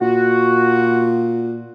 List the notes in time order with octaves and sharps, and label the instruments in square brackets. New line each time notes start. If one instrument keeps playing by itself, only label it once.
[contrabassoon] A#2 [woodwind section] F#4